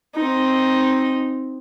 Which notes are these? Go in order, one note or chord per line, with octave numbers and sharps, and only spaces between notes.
C4 D#4